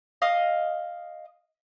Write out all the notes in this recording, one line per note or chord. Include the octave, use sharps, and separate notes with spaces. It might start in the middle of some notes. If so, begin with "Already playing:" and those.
D#5 F5 D#6